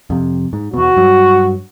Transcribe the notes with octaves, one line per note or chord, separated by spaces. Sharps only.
F2 C3
G#2
E2 B2 F#4
G2 F#3